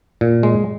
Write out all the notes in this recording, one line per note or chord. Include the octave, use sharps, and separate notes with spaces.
A#2
G#3